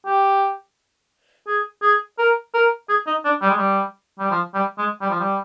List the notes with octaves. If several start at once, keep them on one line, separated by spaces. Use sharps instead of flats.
G4
G#4
G#4
A#4
A#4
G#4
D#4
D4
G3
G#3
G3
G3
F3
G3
G#3
G3
F3
G3